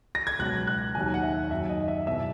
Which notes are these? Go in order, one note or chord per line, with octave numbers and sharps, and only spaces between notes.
A#6
G#6
C#2 B2 F#3 F#6
F#6
D#2 D#3 F#3 G#5
F#5
E5
F#2 D#3 F#3 E5
D#5
E5
E2 B2 F#3 E5